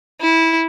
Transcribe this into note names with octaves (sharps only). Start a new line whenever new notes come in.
E4